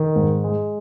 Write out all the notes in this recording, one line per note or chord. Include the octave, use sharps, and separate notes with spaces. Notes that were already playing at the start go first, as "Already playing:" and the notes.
Already playing: D#3
G#2
G#3